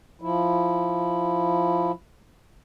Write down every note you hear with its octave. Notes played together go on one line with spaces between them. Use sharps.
F3 E4